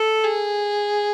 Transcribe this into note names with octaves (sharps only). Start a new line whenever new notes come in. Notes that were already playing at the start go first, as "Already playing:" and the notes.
Already playing: A4
G#4